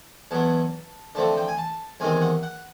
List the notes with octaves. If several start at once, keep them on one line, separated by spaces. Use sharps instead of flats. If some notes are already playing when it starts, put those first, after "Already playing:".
E2 B2 F#3 B3 A5
D3 F3 A3 C4 A5
G5
G#5
A5
E2 C3 D#3 G#3 C4 G#5
F#5
F#5